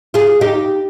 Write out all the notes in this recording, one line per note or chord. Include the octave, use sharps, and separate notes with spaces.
F4 G#4
D#4 G4